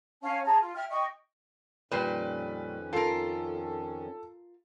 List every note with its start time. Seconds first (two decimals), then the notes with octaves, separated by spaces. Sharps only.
0.22 C#4 C#5 F5 A5
0.44 G#4 A5 A#5
0.60 F4
0.75 E5 G5 F6
0.90 D#5 G5 C#6
1.91 F2 A#2 D#3 G3 C#4 B4
2.93 F4 A4 A#4